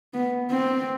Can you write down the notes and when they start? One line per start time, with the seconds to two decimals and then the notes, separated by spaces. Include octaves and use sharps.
0.14 B3
0.50 C4